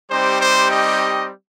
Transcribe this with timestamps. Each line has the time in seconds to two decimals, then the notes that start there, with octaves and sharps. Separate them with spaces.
0.10 G3 C4 D#4 G4 C5
0.40 C5
0.71 D#5